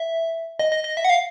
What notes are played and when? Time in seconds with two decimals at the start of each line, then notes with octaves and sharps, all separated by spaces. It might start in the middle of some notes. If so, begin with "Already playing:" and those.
Already playing: E5
0.59 D#5
0.72 D#5
0.84 D#5
0.97 E5
1.05 F#5
1.10 F5